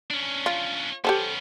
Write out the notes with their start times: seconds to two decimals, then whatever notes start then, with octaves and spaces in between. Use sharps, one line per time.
0.11 C#4 D4
0.46 F4
1.05 B3 C#4 G4 A4 C5